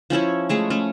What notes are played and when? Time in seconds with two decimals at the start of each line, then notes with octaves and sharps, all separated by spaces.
0.10 F3 C#4 E4 C#5
0.49 G#3 A3 G#4
0.70 A3 C#4